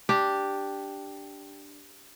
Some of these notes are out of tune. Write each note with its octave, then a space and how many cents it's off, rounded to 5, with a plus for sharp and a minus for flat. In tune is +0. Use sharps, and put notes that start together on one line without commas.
D4 +0 G4 +0